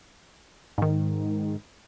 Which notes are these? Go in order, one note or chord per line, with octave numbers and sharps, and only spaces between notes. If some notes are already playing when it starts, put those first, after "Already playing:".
G#2 D#3